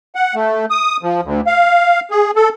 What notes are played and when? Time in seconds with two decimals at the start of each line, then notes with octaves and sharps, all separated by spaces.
0.15 F#5
0.35 A3
0.70 D#6
1.03 F3
1.24 D2
1.47 F5
2.11 G#4
2.36 A4